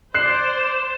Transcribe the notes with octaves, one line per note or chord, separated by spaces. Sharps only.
C5 D5 F#6 C7 E7